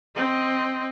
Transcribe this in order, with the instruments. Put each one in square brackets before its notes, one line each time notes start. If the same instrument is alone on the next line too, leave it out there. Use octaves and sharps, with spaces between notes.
[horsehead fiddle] C4 D#5